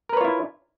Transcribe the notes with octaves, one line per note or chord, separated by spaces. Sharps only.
E4 F4 A#4 B4 C#5